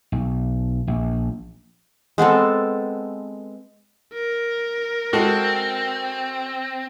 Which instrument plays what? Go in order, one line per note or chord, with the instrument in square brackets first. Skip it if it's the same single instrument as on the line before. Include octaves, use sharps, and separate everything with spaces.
[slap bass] B1
A#1
[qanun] G#3 B3 C4 A4
[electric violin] A#4
[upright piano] G#3 F#4 A4 [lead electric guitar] C4